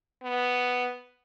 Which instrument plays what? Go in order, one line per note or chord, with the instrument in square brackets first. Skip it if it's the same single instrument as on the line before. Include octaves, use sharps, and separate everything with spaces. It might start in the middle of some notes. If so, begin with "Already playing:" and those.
[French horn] B3